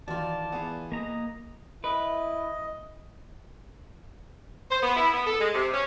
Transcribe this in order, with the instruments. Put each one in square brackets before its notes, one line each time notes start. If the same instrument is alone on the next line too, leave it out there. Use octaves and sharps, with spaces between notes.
[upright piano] D#3 F#4 [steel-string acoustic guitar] E3 F4 [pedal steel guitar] D5 [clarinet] A5
[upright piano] B3 G#4
[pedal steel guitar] A#3 A#5 D#6 [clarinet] D#5
[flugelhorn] E4 [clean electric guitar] B4 [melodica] D#5
[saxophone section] C5
B3
E4
B3
A4
G#3
C3
C#4